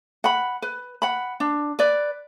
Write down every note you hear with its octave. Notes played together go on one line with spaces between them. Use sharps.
F#5 B5
B4
F#5 B5
D4
B4 D5